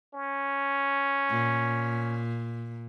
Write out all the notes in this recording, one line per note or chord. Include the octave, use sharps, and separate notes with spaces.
C#4
A#2